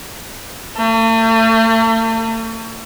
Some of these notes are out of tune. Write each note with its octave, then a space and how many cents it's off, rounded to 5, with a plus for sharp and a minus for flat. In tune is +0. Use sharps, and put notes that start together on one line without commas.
A3 +40